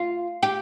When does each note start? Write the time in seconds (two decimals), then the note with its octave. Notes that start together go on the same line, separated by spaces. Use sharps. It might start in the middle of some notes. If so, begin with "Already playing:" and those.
Already playing: F4
0.43 G4